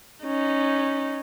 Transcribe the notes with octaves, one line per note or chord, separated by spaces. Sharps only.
C#4 D#4